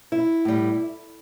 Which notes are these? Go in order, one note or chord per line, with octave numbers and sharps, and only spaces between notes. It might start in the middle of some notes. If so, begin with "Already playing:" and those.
E4
A2 G3